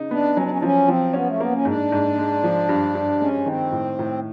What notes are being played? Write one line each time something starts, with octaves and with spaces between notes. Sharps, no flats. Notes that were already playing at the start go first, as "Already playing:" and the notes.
Already playing: C#3 D#4
B3 D4
F#3 C#4
D4
C#4
D4
F3 C#4
F3 C4
B3 C#4
A3
A#3 B3
C#4
G#2 D4
G#2
G#3
F3
G2
G2
G#3 C#4
D#3 C4
A2
A2